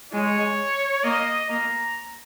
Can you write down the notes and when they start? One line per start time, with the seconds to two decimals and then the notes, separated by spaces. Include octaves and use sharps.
0.12 G#3 C#5
1.04 A#3 D#5
1.49 A#3 A#5